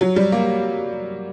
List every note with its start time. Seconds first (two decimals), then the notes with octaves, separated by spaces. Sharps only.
0.01 F#3
0.16 G3
0.32 A#3